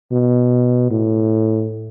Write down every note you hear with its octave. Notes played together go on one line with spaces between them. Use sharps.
B2
A2